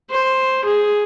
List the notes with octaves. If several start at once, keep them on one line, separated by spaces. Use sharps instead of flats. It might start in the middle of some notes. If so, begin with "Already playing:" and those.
C5
G#4